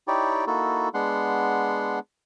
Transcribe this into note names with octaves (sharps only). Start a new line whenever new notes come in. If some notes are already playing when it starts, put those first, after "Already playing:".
D#4 E4 G4 C#5 D5 G5
A#3 D#4 E4 F#4 A4
G#3 B3 D4 F#5 C6